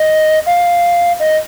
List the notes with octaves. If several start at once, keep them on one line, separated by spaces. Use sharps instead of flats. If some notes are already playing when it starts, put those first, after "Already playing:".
Already playing: D#5
F5
D#5